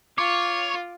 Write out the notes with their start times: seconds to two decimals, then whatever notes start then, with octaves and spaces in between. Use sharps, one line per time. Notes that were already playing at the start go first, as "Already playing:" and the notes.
0.18 F4 C#5 D6